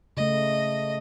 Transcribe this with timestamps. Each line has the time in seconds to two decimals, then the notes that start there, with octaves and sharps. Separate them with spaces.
0.17 C#3 A3 D#5